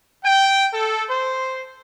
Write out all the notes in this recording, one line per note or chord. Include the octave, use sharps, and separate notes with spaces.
G5
A4
C5